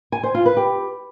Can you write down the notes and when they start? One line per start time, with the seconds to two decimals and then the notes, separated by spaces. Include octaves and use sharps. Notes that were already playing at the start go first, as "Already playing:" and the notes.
0.12 G#5
0.23 C5
0.34 F4
0.46 B4
0.57 G4